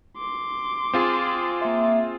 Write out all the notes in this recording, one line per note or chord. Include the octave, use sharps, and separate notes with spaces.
C6 D6
C4 F4 G#4
A#3 E5